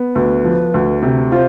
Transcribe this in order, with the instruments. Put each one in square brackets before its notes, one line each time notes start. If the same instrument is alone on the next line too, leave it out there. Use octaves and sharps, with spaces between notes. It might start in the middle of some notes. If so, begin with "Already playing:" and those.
Already playing: [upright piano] B3
[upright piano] D2 [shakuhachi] B4
[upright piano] F3
D2
C3
[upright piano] F4 [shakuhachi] C5